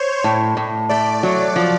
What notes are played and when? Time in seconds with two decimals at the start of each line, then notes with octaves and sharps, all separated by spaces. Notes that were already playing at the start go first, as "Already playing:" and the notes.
Already playing: C5 C#5
0.24 A2
0.57 A2
0.89 A3 D5
1.23 F#3
1.56 F3